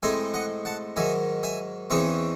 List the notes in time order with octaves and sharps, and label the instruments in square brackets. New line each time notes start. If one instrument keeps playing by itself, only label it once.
[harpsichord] A2 G#3 C4 D#4 E5 G#5
D#5 F#5
F#5 A5
G#2 D#3 F#3 E5 G#5
E5 G#5
E2 C#3 E3 C4 D#4 C#5 E5